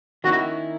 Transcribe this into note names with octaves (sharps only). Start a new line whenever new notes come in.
D#3 A#3 C#4 E4 F#4